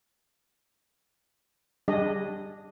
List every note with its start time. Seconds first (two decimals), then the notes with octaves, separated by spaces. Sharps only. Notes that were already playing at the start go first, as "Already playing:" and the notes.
1.88 G3 D4 G#4 D#5